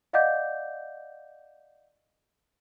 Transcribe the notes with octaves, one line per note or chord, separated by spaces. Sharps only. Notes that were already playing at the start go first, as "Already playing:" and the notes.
D5 D#5 F5 F#5 D6 G6